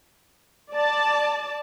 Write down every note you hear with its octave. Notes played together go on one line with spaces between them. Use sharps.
D5 A5